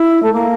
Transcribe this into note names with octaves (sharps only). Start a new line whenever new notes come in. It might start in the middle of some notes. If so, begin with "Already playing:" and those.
Already playing: E4
A3
A#3